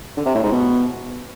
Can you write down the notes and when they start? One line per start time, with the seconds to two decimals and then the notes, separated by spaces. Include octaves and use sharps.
0.17 D3
0.26 C3
0.35 A2
0.43 G#2
0.52 B2